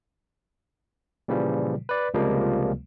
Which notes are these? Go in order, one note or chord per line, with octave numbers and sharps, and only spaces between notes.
A#2 C#3 E3 F3 G3
B4 D5
C#2 C3 F3 G3 G#3 A#3